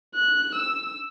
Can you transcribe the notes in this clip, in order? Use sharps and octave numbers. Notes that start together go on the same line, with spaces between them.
F#6
E6